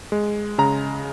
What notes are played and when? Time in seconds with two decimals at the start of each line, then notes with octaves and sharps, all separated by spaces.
0.12 G#3
0.58 C#3 A#5